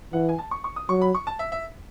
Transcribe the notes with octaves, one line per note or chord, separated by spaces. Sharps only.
E3 F#5
G#5
A5
C#6
C#6
D#6
F#3 C#6
B5
C#6
A5
E5
E5